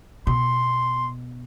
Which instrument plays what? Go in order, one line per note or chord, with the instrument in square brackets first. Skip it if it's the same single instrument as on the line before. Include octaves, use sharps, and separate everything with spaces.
[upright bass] B2 [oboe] C6